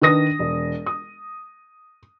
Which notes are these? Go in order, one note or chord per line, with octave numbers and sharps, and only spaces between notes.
D#3 D4 B4 D#6 A#6
E1
D#6